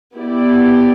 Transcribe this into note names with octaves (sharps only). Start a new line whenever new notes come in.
B3 E4 G4 D5